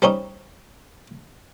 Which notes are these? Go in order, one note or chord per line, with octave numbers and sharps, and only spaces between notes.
G3 C4 C#4 D#4